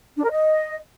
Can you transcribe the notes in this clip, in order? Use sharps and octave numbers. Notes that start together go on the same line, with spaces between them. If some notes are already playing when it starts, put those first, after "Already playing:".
D4
A#4
D#5